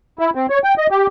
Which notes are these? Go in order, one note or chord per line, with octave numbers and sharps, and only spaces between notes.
E4
C4
C#5
G5
D#5
G4